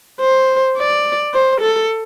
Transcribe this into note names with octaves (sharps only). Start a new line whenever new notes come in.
C5
D5
C5
A4